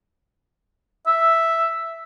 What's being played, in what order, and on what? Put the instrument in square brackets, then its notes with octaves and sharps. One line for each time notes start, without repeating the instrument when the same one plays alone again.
[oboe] E5